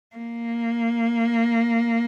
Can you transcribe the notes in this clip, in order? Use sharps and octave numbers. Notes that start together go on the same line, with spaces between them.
A#3